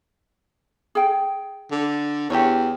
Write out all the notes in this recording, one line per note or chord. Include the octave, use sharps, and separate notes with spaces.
G#4 G5
D3
E2 G4 C#5